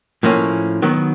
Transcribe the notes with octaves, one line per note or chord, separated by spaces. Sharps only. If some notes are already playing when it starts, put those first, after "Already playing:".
A2 F3 A#3 C#4
D#3 F#3 B3